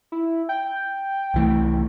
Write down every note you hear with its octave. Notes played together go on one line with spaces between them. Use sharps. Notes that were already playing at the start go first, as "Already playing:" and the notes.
E4
G5
C2 E3 A3